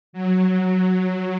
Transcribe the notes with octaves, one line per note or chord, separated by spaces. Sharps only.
F#3
F#3